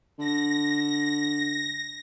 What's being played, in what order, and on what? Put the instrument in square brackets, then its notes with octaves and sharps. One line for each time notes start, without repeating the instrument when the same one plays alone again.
[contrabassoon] D3 [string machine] A#6